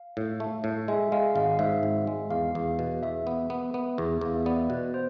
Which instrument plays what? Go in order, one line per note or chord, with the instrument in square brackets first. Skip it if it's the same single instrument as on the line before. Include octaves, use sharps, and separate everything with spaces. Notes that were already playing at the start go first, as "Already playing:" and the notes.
Already playing: [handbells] F5
[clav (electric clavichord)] A2
A3
A2
[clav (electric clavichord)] G#3 [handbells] E5
[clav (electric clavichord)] G#3 [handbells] F5
[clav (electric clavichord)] G#1 [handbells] F5
[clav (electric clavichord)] G#2 [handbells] E5
[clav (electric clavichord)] G#1
G#3
[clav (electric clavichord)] E2 [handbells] F5
[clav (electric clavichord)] E2
B2
[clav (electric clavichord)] E2 [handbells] E5
[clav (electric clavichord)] B3
B3
B3
E2
[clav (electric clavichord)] E2 [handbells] F5
[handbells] E5
[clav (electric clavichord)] B3 [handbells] D5
[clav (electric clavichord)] B2 [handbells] B4
[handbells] C5